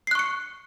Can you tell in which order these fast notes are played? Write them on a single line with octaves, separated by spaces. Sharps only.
C7 F#6 C#6 C#7